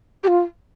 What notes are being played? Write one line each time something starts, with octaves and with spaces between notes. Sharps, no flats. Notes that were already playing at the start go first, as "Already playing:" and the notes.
G4
F4